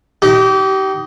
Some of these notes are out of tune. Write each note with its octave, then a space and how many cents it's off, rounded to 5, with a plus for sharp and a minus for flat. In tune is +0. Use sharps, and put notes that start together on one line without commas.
D#4 +0 G4 -30